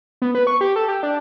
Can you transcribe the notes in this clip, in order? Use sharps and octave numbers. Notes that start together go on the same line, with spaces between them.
B3
B4
C#6
G4
A4
G4
D4